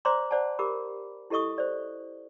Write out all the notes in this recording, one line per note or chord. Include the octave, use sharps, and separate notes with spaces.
C5 D5 E5 A#5 C6 D6
C5 D5 F#5 A5
G4 A#4 B5 D6
E4 G4 A4 D#5 C#6 D#6
C5 D5